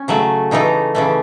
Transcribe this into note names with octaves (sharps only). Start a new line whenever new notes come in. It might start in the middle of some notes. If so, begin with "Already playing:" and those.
Already playing: C#4
C#3 F#3 A3
C#3 E3 A3 D#4
C#3 E3 A3